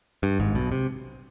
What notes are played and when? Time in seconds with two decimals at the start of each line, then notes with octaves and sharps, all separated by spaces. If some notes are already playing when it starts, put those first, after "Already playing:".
0.23 G2
0.40 G#1 G#2
0.55 B1 B2
0.72 C3